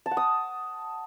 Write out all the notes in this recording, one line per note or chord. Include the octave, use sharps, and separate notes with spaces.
A5
F#5
D#6